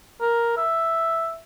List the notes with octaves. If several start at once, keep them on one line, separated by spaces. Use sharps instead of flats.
A#4
E5